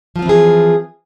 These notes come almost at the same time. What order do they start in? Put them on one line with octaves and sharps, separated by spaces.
F3 F4 C4 E3 G#4